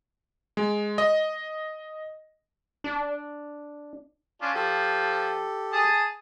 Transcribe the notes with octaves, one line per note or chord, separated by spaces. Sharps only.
G#3
D#5
D4
C#4 D4 F4
F3 G4 A4
G#4 A5 D#6